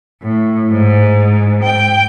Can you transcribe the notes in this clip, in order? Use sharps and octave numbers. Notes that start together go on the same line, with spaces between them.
A2
G#2
G5